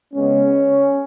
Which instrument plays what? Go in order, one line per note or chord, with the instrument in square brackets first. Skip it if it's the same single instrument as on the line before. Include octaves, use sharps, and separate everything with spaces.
[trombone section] C#3 G#3 B3 C#4